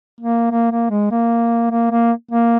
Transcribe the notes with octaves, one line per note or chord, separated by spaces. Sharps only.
A#3
A#3
A#3
G#3
A#3
A#3
A#3
A#3